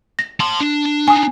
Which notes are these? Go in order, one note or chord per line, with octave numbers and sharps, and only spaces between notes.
A#6
A5 C6
D4
D4 D#4 G#5 D#6